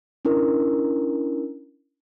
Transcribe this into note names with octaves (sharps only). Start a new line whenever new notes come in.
C#4 D4 E4 A#4